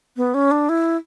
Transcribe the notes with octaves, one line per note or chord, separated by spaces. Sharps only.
B3
C#4
D4
E4